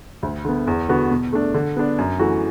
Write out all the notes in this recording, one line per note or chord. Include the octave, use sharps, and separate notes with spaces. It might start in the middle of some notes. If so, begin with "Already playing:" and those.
D2
D3 B3
E2
D3 B3 F#4
B2
A3 D4
D3
B3 D4
F#2
E3 A3 F#4